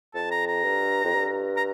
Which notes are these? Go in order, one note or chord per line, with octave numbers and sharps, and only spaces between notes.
F2 A5
A#5
A#5
G2
F2
G2
A#5